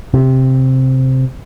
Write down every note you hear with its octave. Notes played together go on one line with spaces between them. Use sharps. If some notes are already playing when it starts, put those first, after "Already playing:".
C3